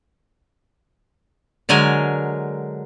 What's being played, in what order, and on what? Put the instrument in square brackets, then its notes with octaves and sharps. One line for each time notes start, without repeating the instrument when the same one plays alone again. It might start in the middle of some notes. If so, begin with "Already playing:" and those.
[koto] D3 F#3 G#3 A#4 G#5